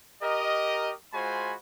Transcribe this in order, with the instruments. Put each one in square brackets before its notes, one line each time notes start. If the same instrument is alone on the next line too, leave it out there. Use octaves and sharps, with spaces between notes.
[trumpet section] G4 A#4 D#5
G#3 F4 F#4 C5 G#5 B5